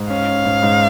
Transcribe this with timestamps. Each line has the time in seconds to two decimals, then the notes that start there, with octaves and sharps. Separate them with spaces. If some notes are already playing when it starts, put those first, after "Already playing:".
Already playing: G#2
0.10 C#4 F5
0.28 C#4
0.46 G#2
0.63 G#2